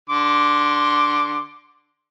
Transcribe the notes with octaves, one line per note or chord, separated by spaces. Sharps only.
D3 C6 D6